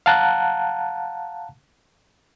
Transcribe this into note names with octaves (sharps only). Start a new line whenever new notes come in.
F5 F#5 A5 A#5 F#6